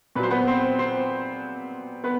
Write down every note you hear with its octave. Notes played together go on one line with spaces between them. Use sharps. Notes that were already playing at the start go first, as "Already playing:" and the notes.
A#2 F#3 B4 C5
B3 B4
C4 C5
C4 C5
B3 B4